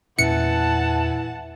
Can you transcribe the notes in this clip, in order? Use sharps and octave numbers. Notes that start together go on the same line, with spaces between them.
E2 A#2 E3 C#4 F#5 A5 C#7